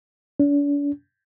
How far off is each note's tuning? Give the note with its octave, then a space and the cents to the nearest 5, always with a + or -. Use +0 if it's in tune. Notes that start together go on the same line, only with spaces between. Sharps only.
D4 -45